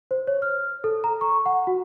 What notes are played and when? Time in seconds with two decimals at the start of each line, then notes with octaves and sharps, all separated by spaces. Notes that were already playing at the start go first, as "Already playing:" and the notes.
0.11 C5
0.27 C#5
0.42 F6
0.84 A4
1.04 A#5
1.21 C#6
1.46 F#5
1.67 F#4